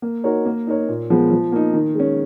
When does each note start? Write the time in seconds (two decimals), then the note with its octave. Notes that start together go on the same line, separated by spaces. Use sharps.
0.02 A#3
0.24 D#4 F#4 A#4 C#5
0.46 A#3
0.67 D#4 A#4 C#5
0.89 A#2
1.10 F3 G#3 B3
1.31 F3
1.52 A#3 D#4
1.74 D#3
1.95 G#3 C#4